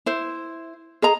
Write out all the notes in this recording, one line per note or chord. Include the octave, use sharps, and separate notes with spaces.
E4 C5
G#4 D#5 A#5